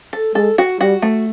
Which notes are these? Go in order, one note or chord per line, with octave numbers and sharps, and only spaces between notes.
A4
G#3 A4
F#4
G3 F#4
A3